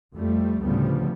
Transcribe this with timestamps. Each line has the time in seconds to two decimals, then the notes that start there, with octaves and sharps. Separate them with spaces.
0.15 F2 G3 A3
0.63 D2 A2 C#3 F3 G3 B3